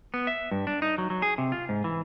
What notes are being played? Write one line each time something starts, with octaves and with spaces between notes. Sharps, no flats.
B3
E5
G2
D4
D#4
F#3
F#3
G#4
C3
F4
G#2
E3